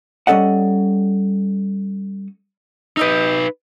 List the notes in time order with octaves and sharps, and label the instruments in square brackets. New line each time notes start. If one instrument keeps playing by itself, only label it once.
[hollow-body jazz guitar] G3 C#4 A4 D#5 F#5
[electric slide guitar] D#4 B4 [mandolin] G4 D#5 E6